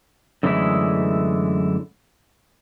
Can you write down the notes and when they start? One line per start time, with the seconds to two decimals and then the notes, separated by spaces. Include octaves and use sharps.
0.43 F#2 D3 E3 G#3 A3 E4